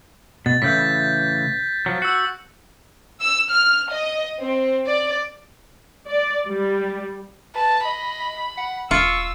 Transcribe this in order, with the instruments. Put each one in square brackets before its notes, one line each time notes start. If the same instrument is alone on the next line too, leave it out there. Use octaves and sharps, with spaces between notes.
[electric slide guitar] B2 [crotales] A6
[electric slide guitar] A2 C#3 E3 [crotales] G6 B6
[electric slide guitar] F3 F#3
[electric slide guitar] F#4 [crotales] E6 C#7
[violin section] E6
F6
D#5
C4
D5
[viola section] D5
G3
[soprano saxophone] B4 [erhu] A5
[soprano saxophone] D#5 [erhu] B5
[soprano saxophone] F#5
[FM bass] D#1 [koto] F4 [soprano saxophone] C#6 [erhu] E6